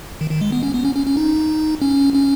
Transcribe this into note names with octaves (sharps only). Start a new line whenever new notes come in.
D#3
D#3
G#3
B3
C#4
B3
C#4
C#4
C#4
D#4
C#4
C#4